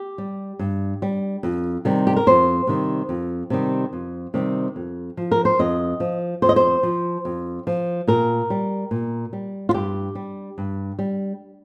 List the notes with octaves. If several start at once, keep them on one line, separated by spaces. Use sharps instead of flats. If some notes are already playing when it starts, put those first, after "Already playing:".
Already playing: G4
G3
G2
G3
F2
C3 D#3 G3
G4
A#4
F2 C5
C3 D#3 G3
F2
C3 D#3 G3
F2
C3 D#3 G3
F2
F3
A#4
C5
F2 D#5
F3
F2 C5
D#5
C5
F3
F2
F3
A#2 A#4
G3
A#2
G3
F4
G2 G4
G3
G2
G3